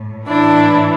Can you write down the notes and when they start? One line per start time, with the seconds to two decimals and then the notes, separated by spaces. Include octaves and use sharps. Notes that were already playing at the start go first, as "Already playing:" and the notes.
Already playing: A2
0.27 A2 E3 D4 E4